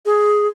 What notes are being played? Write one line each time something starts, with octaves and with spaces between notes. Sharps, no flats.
G#4